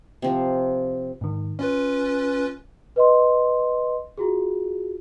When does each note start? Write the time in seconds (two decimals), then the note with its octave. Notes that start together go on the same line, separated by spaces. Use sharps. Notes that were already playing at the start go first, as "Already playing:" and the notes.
0.22 C3 F3
1.21 G#2 D#3
1.59 C#4 F4 B4 C#5
2.96 B4 D#5 C6
4.17 F4 F#4 G#4